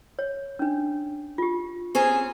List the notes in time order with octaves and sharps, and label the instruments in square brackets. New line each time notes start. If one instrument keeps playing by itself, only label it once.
[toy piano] C#5
C#4 D4
F4 G4
[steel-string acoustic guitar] C4 C#4 C5 [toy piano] G4 A#5 [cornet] G#4